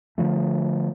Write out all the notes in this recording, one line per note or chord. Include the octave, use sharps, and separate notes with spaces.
D3 D#3 F3 A3